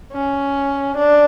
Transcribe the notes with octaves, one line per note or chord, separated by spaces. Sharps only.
C#4
D4